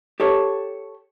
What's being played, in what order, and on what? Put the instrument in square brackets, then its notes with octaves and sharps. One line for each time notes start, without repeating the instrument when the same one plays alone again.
[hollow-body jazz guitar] G4 A4 C#5